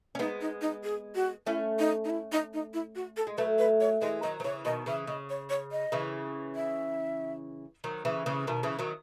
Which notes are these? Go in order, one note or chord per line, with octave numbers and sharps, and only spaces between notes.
C#4
G#3 B3 D#4
D#4
D#4
G#4
F#4
A3 C#4 E4
D#4
D#4
E4
D#4
D#4
E4
F#4
A4
G#3
F#3 A3 B4
B4
C#5
E3 G#3 D#5
D#3 F#3 D#5
F#3 B4
C#3 E3 C#5
B2 D#3 D#5
C#3 E3 E5
C#3 D#5
C#5
C#5
D#5
C#3 E3
E5
D#3 F#3
C#3 E3
C#3 E3
B2 D#3
C#3 E3
D#3 F#3